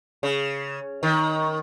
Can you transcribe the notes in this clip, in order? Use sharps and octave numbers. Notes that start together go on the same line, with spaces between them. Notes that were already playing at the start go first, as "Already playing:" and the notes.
C#3
D#3